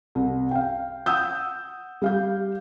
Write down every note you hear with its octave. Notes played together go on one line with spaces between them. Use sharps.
C2
F5 G5
F#5 D#6 E6 G6
G3 F5 G6